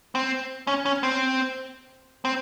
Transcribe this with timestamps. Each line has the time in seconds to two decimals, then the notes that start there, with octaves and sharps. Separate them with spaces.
0.15 C4
0.67 C#4
0.86 C#4
1.03 C4
2.25 C4